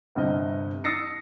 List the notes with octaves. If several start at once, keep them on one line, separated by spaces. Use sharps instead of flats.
G1 G2 C3 D#5
D#6 E6 A6 A#6 C7 C#7